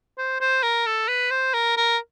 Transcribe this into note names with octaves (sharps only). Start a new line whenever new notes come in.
C5
C5
A#4
A4
B4
C5
A#4
A#4